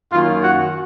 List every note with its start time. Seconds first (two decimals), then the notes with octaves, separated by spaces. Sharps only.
0.12 F#2 D#3 A#3 C#4 F4
0.44 F#4